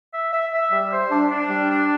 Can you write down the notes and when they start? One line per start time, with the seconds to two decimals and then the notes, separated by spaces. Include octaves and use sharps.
0.13 E5
0.32 E5
0.52 E5
0.71 G3
0.91 C5
1.10 D4
1.30 D4
1.49 G3
1.70 D4